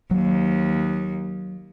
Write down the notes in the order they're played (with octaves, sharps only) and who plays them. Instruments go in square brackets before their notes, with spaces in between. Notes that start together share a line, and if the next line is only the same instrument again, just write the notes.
[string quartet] D#2 [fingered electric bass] F#3